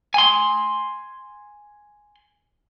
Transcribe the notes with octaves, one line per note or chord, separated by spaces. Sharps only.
G#5 C6